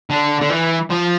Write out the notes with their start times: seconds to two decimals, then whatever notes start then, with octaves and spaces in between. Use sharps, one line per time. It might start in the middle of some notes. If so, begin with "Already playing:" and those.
0.10 D3
0.41 D3
0.49 E3
0.90 F3